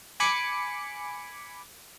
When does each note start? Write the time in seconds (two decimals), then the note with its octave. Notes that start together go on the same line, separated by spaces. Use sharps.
0.20 G#5 B5 D6 C#7